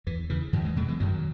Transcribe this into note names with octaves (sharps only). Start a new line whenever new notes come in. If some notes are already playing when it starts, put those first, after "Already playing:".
E2 E3
C#3 E3
E2 D#3 F#3
E3 G#3
B2 F#3 A3
E3 G#3
F#2 D#3 F#3